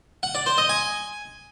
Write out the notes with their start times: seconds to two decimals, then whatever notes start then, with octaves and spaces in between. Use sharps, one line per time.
0.23 F#5
0.35 D5
0.46 C5
0.58 D#5
0.69 G#5